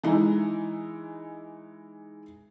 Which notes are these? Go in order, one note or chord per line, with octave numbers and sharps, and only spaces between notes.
E3 G#3 D#4 E4